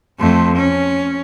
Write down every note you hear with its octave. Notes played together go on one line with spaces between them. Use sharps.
F2 A3
C#4